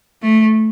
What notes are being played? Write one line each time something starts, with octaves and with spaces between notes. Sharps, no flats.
A3